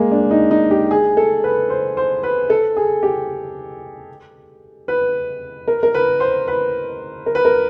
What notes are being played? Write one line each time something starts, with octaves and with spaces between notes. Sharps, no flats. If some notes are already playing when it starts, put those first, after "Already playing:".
Already playing: G#3 A#3
D4
D#4
D#4
G4
G#4
A4
B4
C5
C5
B4
A4
G#4
G4
B4
A#4
A#4
B4
C5
B4
A#4
B4
A#4